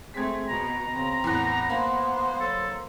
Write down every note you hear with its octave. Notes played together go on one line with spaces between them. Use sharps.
A3 C4 G#4 G#6 B6
B2 A#5
C#3 C4
E2 A2 B3 F#6
A#3 C5 B5
F#3 A4